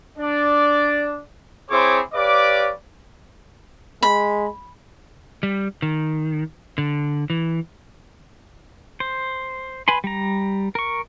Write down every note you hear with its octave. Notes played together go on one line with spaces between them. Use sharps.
D4 D5
C4 E4 G#4 C5 C#5 D6
G4 B4 C#5 D5 F5 D6
G#3 B5
G3
D#3
D3
E3
C5
B4 G#5 B5 C6
G3 A#5
A#4 C#6